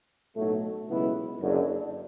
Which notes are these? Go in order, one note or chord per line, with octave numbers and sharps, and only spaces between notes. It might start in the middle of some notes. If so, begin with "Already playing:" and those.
B1 A2 F#3 A3
C#2 B2 F#3 B3 E4
F#1 F#2 D3